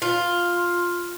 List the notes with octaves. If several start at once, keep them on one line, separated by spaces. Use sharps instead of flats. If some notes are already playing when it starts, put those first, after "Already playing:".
F4